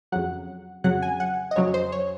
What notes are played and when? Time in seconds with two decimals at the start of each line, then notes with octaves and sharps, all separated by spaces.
0.12 F2 C#3 F#3 F#5
0.84 F2 C#3 F#3 F#5
1.02 G#5
1.20 F#5
1.51 D#5
1.56 F2 C#3 F#3 C#5
1.74 C5
1.92 C#5